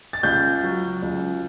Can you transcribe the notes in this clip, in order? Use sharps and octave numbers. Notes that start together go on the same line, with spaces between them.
A6
C#2 G6
F#3
C#2